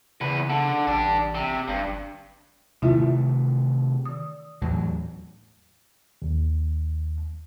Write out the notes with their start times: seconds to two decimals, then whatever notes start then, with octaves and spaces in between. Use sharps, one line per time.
0.21 E2 C#3 B4
0.50 D3
0.87 A1 D4 G4
1.35 C3
1.68 G1 G2
2.82 C3 D#3 A3 E4 F4 E5
4.05 D#3 D#6
4.62 E2 A2 F#3
6.22 D#2